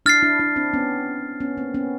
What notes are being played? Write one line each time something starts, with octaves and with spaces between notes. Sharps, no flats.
D4 E4 F6 A6 C7
D4 E4
D4 E4
C4 D4
B3 C#4
B3 C#4
A#3 C4
B3 C#4